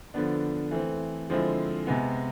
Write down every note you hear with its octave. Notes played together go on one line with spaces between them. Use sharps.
D3 F3 B3 D4
E3 A3 C4
D3 F3 G#3 C4 E4
C3 G#3 B3